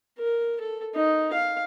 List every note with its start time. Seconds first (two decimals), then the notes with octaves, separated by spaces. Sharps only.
0.18 A#4
0.60 A4
0.95 D#4
1.33 F5